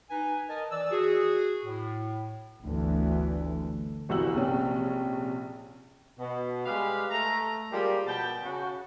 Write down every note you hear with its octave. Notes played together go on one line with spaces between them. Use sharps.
D#4 B4 G#5
A#4 D#5 G#5 A5
E3 D5 E6
F#4 G#4
A2
G1 D2 E3
G1 C2 E3 F#4 E6 F#7
A#1 C3 C#4
B2
G3 G#3 G4 B4 F5
A3 A#5
F3 G3 G#3 A#3 G4
B2 G5 A5
C#3 F#4